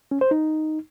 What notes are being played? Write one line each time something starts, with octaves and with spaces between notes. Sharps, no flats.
C#4
C5
D#4